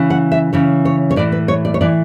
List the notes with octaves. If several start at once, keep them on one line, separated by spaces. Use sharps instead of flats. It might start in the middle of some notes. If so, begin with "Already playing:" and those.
Already playing: C#3 E3
F#5
E5
C#3 E3 C#5
C#5
C#5
A2 E3 D5
B4
C#5
D5
C#5
A2 E3 D5